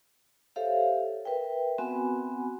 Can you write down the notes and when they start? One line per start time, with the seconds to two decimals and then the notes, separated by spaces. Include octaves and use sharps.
0.56 G4 A4 C5 C#5 E5 F5
1.25 A#4 B4 E5 G5
1.78 B3 C4 F#4 F#5 G#5 B5